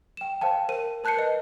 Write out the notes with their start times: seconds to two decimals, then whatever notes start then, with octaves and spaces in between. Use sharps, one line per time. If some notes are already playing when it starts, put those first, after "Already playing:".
0.17 G5 E7
0.41 C5 F5 G5 A5
0.69 A#4 C5 D#7
1.04 A#4 A5 F#6 G6 C7 C#7
1.17 B4 D#5